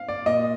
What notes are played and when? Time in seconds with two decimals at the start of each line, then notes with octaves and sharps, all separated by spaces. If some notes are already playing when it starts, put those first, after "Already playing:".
Already playing: F5
0.09 D5
0.26 A#2 D#5